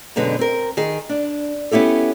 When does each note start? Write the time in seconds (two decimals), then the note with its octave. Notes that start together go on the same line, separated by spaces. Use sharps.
0.16 F#2 B2 D3 G#3 B3
0.39 C4 A#4
0.77 D#3 G#4
1.09 D4
1.71 B3 C#4 E4 G4 A4